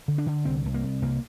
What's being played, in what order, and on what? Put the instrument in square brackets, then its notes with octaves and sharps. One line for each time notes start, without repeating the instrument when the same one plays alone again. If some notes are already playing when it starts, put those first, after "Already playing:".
[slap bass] D3
D4
D3
C2 C4
C2
A#3
C2
C2 A#3